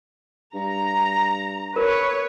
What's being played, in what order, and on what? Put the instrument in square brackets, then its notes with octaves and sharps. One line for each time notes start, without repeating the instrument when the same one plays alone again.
[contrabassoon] G2 [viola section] A#5
[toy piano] A#4 [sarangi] B4 [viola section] C#5